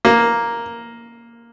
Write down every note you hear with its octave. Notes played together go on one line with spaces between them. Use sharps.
A#3